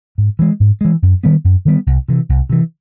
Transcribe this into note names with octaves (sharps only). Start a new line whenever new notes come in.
G#2
E3 G#3
G#2
E3 G#3
F#2
D#3 G3 B3
F#2
D#3 G3 B3
C2
C3 E3
C2
C3 E3